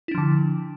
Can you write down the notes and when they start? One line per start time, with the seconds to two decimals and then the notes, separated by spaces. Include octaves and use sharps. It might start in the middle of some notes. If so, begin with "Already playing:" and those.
0.08 E4
0.11 D4
0.15 F3
0.18 D3